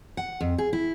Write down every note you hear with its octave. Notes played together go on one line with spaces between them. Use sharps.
F#5
F2
G#4
E4